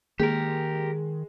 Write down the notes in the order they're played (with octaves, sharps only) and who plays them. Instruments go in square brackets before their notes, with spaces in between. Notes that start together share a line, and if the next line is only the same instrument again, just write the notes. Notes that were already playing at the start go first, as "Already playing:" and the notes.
[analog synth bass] D#3 [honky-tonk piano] G#3 [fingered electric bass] A#3 [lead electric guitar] G4 A#4